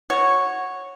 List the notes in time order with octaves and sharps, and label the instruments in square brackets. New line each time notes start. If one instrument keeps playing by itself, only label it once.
[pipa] F#4 C#5